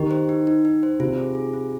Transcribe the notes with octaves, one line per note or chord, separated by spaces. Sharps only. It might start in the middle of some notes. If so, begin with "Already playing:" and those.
Already playing: D#3 G4
C5
D#4
D#4
D#4
C5
C3 F4
G#4
G#4
F4